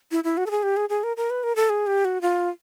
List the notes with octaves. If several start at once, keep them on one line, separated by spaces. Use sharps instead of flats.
E4
E4
F#4
A4
G#4
G4
G#4
G#4
A#4
A#4
B4
A#4
A4
G#4
G4
F#4
F4